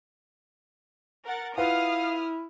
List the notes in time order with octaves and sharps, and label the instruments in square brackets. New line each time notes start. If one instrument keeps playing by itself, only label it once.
[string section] A#4 F#5 A6
[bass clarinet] E4 [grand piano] F4 B4 F#5 [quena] F5 [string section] D#6 F6